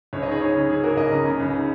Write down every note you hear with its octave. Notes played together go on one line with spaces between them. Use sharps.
C#2 C#5
D#5
D#4 G#4 C#5
D#4 G#4 C#5
C#3
C#3 G#4
A#3 F#4 A#4
C#2 A#4 D#5
C#3 A#5 D#6
C#3
C#2
D#4